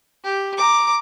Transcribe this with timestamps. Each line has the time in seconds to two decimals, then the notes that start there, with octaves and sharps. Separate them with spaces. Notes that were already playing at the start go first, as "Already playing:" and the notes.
0.24 G4
0.58 A#5 D6